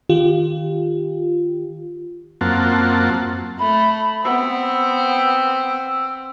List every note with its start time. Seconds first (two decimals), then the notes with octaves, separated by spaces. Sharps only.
0.09 D#3 F4 G4
2.41 F#2 A#3 C4 F4 F#5 A5
3.59 A3 B5
4.24 B3 C4 E6